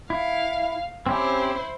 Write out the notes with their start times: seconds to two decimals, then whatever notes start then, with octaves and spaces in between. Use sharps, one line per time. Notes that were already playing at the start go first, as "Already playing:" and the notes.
0.10 E4 F5
1.06 C4 C#4 E4 G4 C5